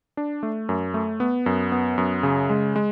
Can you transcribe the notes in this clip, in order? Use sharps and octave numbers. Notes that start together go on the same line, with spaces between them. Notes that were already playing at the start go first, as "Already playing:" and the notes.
D4
A3
F#2
A3
B3
F#2
B3
F#2
C#3
G#3
G#3